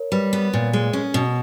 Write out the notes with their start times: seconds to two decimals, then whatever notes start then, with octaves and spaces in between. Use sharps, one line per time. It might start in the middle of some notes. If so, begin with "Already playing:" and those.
Already playing: A#4 C#5
0.12 G3 B4
0.33 B3
0.54 A#2
0.73 G#3
0.93 C#4
1.14 B2